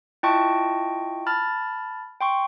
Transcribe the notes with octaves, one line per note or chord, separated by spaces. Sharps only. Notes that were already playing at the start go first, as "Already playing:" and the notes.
E4 F4 D#5 G5 A5 C#6
A5 B5 F6 A6
G5 C6 C#6